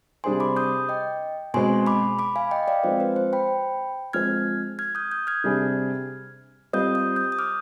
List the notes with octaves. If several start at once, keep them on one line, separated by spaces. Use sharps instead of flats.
C3 G3 D4 G#4 C5 G#5 C6
B5 D6
D#6 G6
D#5 G5
B2 G#3 C4 G#5 C6
B5 D6
B5 D6
F5 G#5
D#5 G5
D5 F5
F3 G#3 C4 C5
B4
C5
G5 B5
F3 G#3 C4 F6 G#6
F6 G#6
D#6 G6
D#6 G6
F6 G#6
C3 G3 D4 G#4
G3 C4 F4 C5 D#5 D#6 G6
D#6 G6
D#6 G6
D#6
D6 F6